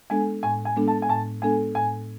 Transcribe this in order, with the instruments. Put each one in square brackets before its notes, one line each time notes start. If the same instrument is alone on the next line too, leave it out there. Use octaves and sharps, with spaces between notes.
[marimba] G#3 B3 D4 A4 [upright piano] G#5
[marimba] A2 [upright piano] G#5
[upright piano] G#5
[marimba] G#3 B3 D4 A4
[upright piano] A5
G#5
[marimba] A2 [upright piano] A5
[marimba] G#3 B3 D4 A4 [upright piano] G#5
[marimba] A2 [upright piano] G#5